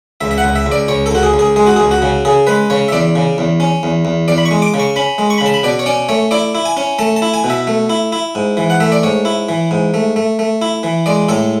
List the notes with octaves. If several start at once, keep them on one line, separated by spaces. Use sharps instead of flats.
C#2 E5
E5
F#5
C#2
E5
C#2
D5
C#2 C#5
A4
C#2 F#4
G#4
C#2
G#4
G#3 G#4
F#4
C#2 G#4
F#4
C#3
C#3 G#4
G#3 B4
C#3 C#5
E5
E2 D5
C#3
E2
C#4
E2
E2
E2 D5
B5
C#6
G#3
D6
C#3
C#6
C#4 B5
G#3
C#6
B5
C#3 A5
B5
B2 D5
C#5
C#4 D5
A3 C#5
E4 D5
E4
G#5
C#4
A3 A5
A5
E4
G#5
B2
E5
A3
E4
E4
G#2
E3
F#5
A3 E5
D5
G#2 C#5
E4
E3
G#2
A3
A3
A3
E4
E3
G#3 D5
A2 A4